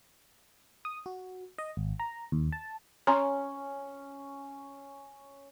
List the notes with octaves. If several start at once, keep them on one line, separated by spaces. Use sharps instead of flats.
D#6
F#4
D#5
G#1
A#5
D#2
A5
C#4 C#5 A#5 C6